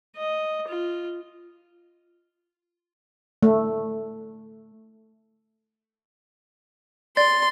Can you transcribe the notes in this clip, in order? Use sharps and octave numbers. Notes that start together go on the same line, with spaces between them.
D#5
F4
A3
D5 C6 A6